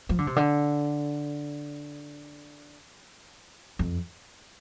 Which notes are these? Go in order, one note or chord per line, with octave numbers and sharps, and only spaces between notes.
F3
D3
C3
D3
F2